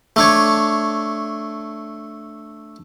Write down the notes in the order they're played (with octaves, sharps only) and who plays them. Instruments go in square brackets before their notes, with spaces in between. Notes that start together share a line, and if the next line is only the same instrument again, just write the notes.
[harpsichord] A3 D4 C#5